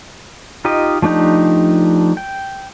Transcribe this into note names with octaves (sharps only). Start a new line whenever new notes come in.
D#4 F4 G4 D#5
F3 A3 D4 D#4 G4
G5